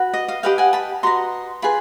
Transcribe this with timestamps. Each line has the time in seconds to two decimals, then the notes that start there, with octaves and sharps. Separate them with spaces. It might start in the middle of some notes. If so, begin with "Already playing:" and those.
Already playing: F#4 B4
0.14 D#5
0.28 D#5 F5
0.43 G4 B4 D#5 F5 G5
0.58 F#5 G#5
0.73 A5 B5
1.03 F#4 B4 D#5 A#5 C6
1.62 F4 G#4 B4 B5